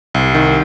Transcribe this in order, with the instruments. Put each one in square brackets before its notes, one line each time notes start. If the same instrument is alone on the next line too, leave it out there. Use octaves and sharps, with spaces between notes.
[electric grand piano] C2
D#3